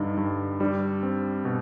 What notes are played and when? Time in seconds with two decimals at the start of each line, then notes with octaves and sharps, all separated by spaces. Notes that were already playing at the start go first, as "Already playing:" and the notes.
Already playing: G2 D3 G3 D#4
0.17 G2
0.60 G3 D4
1.03 C4
1.45 B2